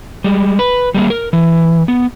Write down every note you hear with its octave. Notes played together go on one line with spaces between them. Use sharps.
G3 G#3
B4
G3 G#3 A#3
A#4
E3
B3